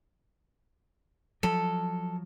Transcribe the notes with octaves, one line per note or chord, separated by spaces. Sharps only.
F3 F#3 A4